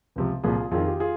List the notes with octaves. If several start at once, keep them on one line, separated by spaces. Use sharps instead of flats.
C#2 C3 F3
C2 A#2 F3 F4 G#4
F2 D#3 F4 G#4
G4
F4 G#4